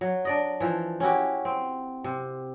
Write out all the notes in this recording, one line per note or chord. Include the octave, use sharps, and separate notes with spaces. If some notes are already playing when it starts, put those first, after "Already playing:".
F#3
D4 D5 D#5
E3 F3
C#4 E4 F#4 G4
C4
C3